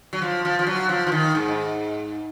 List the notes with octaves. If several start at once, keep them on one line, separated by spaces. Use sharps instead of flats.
F#3
F3
F3
F3
F#3
F3
F3
D#3
G#2